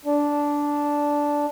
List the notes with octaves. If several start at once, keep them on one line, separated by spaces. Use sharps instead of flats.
D4